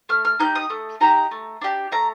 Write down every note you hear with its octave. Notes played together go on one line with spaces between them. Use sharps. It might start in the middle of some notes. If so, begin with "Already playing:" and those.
A3 F6
F6
D#4 G4 G6
D#6
A3
D#4 G4 A#5
A3
D4 G4
A3 A#5